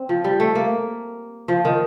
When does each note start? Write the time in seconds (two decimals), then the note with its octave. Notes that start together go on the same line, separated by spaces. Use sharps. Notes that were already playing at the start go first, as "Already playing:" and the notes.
Already playing: C4
0.09 F3
0.24 G3
0.40 A3
0.55 A#3
1.48 F3
1.65 D#3